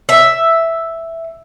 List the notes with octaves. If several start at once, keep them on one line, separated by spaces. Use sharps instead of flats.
E5